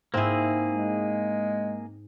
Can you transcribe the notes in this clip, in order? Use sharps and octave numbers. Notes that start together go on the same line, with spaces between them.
G#2 A#3 C4 E4 G#4
G#3